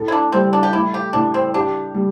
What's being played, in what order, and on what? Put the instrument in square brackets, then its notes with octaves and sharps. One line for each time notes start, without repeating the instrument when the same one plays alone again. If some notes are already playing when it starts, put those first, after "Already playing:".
Already playing: [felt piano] A2 A4
[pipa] E4
D4
[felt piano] G3 [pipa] C4
[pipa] D4
G4
[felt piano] A3 [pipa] E4
[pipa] G4
[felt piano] A2 [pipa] D4
[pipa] C4
[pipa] D4 [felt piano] G4
[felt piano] G3